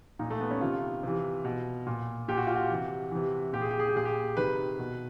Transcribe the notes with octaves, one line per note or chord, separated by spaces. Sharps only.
A#2 D#4
A3
B3
C#4
C3 D#3 F4
C3 E3
B2
A#2
A#2 G4
F#4
F4
F#4
C3 E3
C3 E3
A#2 G4
G#4
G4
G#4
G4
A#2 G#4
G4
C3 D#3 B4
B2